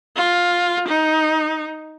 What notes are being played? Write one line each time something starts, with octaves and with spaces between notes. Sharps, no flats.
F4
D#4